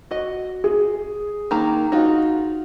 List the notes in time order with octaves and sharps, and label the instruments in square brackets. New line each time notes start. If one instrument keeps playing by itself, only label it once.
[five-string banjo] F#4 D#5
[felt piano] G#4
[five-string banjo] D#3 A#3 A#5
D#4 F4 F#4